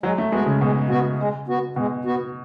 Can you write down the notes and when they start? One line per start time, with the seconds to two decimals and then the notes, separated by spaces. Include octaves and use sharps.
0.03 F#3 G#3
0.18 A3
0.32 G#3 B3 F#4
0.46 C#3
0.61 B2 G#3
0.89 B2 B3 F#4
1.19 G#3
1.47 B3 F#4
1.76 B2 G#3
2.05 B3 F#4